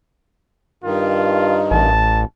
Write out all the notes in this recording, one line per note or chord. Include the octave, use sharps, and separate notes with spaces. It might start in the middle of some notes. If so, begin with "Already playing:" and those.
G2 D#3 F4
A1 A5